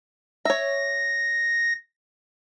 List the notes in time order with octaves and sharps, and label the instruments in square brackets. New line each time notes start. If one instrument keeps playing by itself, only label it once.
[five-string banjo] C#5 E5 [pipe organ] A#6